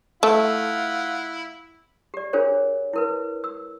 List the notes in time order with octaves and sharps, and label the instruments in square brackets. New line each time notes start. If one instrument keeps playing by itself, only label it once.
[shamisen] A3 [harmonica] E4 F4 F#5
[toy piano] G4 D5
D4 F4 G#4 A#4 C5 C#5
E4 A#4 B4
E6